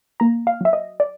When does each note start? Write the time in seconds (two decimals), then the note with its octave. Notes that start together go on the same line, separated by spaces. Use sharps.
0.20 A#3 A#5
0.47 F5
0.61 F#3 E5
0.73 D#5
1.00 D5